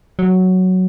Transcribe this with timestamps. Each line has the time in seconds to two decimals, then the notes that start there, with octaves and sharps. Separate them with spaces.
0.19 F#3